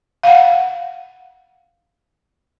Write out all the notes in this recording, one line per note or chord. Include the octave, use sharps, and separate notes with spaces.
F5 F#5